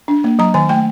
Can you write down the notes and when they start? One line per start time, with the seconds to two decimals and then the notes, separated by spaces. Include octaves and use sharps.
0.08 D4
0.24 A#3
0.39 F#3 A#5
0.54 D#3 G#5
0.69 A3 G5